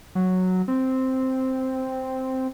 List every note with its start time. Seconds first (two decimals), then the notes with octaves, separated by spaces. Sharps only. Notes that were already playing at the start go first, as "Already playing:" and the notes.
0.15 F#3
0.68 C4